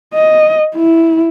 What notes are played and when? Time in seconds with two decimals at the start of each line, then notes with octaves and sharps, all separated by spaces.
0.14 D#5
0.76 E4